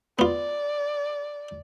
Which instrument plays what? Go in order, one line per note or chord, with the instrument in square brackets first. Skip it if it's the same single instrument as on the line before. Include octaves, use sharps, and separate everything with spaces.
[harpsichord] B3 F4 [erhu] D5